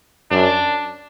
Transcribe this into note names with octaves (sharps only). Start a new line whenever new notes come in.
F#2 D4